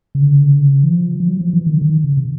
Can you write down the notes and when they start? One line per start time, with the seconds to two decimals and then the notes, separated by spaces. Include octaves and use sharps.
0.15 C#3
0.22 D3
0.30 C#3
0.38 D3
0.46 C#3
0.53 D3
0.61 C#3
0.84 E3
0.91 F3
1.20 F3
1.28 F#3
1.41 F3
1.53 E3
1.66 D#3
1.74 D3
1.82 D#3
2.04 C#3
2.17 C3